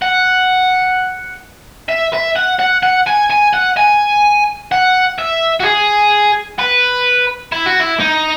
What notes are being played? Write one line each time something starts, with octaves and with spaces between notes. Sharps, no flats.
F#5
E5
E5
F#5
F#5
F#5
G#5
G#5
F#5
G#5
F#5
E5
F#4
G#4
B4
E4
F#4
E4
D#4